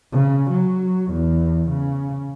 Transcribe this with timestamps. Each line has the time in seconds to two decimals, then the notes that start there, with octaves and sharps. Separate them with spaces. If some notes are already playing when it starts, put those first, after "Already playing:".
0.12 C#3
0.51 F#3
1.12 E2
1.70 C#3